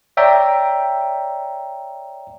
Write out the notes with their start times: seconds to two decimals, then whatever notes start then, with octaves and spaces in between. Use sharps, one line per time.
0.17 C#5 D5 E5 G5 A#5